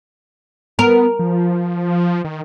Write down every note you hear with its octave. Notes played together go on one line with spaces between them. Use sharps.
B3 A#4
F3
D#3